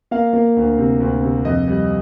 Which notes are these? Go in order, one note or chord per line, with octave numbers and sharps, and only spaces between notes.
A#3 F5
A#3
D2
C3
D2
C3
F2 D#5
G3